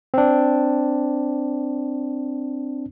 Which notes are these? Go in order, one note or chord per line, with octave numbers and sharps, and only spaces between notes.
C4 D4